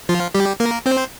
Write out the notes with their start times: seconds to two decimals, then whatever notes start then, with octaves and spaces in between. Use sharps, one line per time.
0.09 F3 F4
0.34 G3 G4
0.60 A#3 A#4
0.86 C4 C5